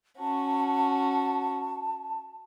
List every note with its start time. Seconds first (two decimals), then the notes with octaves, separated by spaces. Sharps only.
0.19 C#4 F#4 A5